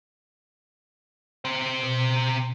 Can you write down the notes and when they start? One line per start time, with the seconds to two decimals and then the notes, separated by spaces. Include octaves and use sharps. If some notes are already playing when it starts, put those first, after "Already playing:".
1.45 C3 C5
1.83 B2